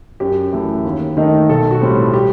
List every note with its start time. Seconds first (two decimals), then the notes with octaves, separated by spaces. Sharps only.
0.20 F#2 G4
0.53 E3 A3
0.85 D#2
1.17 D#3 A3 D#4
1.49 B1 A4
1.71 F#4
1.81 A2 G3 C4
2.13 G4